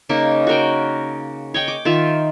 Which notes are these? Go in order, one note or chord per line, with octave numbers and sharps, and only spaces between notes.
C#3 A#3 D#4
F#4 A#4 G5
C#5 D#5 G5
D6
D#3 F4 E5